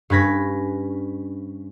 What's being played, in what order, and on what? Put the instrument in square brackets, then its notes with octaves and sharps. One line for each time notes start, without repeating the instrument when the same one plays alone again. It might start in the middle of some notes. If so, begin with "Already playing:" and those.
[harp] G2 C#4 B4 G#6 A#6 B6